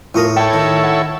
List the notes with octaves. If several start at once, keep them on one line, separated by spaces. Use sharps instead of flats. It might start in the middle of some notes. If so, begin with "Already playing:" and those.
A2 F4 A4 A#4 C#6 D#6
E4 A4 C#5 G5 A5
D#3
F#5